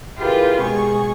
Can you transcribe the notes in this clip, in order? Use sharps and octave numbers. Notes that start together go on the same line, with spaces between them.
E4 F4 G4 G#4 A#4 B4
B2 G#3 G#4 G#5 C#6